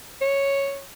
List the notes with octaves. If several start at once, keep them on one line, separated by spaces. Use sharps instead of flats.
C#5